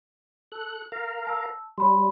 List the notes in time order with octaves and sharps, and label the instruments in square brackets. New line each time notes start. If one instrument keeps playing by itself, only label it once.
[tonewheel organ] A4 F#6
A#4 F5 A#5
[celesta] A5 E6
[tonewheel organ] G3 [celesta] C#5 B5 C6